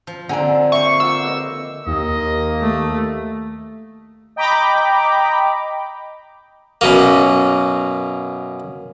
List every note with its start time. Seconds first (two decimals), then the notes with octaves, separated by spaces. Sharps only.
0.07 F3
0.29 D3 C4 F#5 G#5 A#5
0.72 A#3 C5 E5 C#6
1.00 F4 F#5 E6
1.23 B4 D5 D#5
1.87 D#2 A#3 D#5
2.61 A3
4.36 D#5 G5 A#5 B5 D6
6.81 F#2 B2 A#3